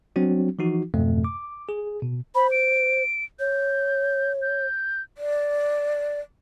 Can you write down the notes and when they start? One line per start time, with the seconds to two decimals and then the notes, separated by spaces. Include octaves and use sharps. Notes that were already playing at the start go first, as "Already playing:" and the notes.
0.16 F#3 C4 D4 F#4
0.59 E3 F3 D#4 F#4
0.94 F2 G#2 B2 A3
1.24 D6
1.69 G#4
2.02 B2
2.35 C5 B5
2.52 D7
3.39 C#5 G6
4.42 G6
5.18 D5